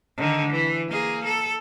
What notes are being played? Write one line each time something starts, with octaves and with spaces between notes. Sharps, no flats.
D3 D#3
E3
A#3 G#4
A4